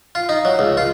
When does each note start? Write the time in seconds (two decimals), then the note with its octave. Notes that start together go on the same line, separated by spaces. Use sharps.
0.15 F4
0.29 D#4
0.45 F#3
0.59 C#2
0.77 F4